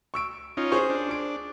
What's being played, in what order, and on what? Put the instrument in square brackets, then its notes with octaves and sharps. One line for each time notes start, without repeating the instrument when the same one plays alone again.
[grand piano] C#6 E6 D7
[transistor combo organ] C#4 D#4 F4
[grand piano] G#4 C5 C#6
[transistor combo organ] D4
[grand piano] D6 D7